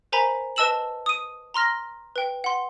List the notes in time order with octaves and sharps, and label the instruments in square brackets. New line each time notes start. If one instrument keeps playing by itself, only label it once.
[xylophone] A#4 C5 G#5 A#5 B5 B6
B4 D#5 A5 E6 E7 F#7
D#6 D#7
A#5 C6 F6 A#6
B4 G5
F#5 C6